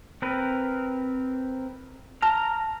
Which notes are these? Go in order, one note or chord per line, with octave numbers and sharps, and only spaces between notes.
C4 A#4 B4
A5 A#5 F6